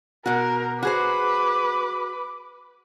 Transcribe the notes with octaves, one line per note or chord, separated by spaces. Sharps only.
B2 F#4 A#4
F#4 G#4 B4 C5 D6